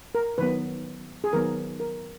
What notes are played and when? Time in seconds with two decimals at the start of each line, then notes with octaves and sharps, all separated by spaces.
0.15 A#4
0.38 D#3 F#3 B3 B4
1.24 G#4
1.33 D#3 F#3 B3 A#4
1.80 A#4